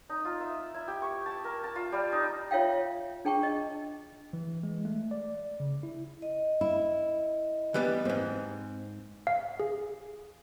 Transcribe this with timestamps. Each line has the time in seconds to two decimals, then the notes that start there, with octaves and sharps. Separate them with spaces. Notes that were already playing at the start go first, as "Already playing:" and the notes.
0.10 D#4
0.25 F4
0.40 E5
0.74 E4
0.88 G4
1.02 C#6
1.26 A5
1.44 A#4
1.64 A5
1.75 F4
1.92 G3
2.12 D#4
2.51 F4 C#5 E5 F5 G5
3.25 D4 G#4 G5 A5 C#6
3.43 D#5
4.33 E3
4.63 G#3
4.85 A3
5.11 D5
5.60 C#3
5.83 E4
6.22 D#5
6.61 E4
7.74 E3 G3 B3
8.05 E2 G#2 C4
9.27 F5
9.60 G#4